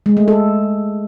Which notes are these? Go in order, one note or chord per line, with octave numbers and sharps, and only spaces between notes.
G#3
A3
A4